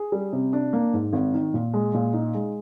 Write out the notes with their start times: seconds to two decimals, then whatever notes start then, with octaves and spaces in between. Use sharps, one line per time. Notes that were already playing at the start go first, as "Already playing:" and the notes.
Already playing: G#4
0.12 G3
0.33 C3
0.53 D4
0.73 A#3
0.93 G#2
1.13 G#1
1.34 D#3
1.54 A#2
1.74 G#3
1.94 A#2
2.13 D#4
2.34 G#3